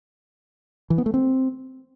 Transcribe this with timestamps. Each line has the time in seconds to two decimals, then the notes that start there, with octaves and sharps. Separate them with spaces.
0.90 E3
0.98 B3
1.06 A3
1.14 C4